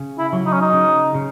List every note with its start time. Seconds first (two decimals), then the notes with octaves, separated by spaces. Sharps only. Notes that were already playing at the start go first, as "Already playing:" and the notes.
Already playing: C#3
0.18 E4
0.33 F#3
0.46 D#4
0.53 C#4
0.61 D#4
0.73 C#3
1.14 C#3